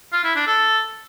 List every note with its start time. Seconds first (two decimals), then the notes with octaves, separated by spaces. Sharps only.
0.13 F4
0.24 E4
0.36 D4
0.47 A4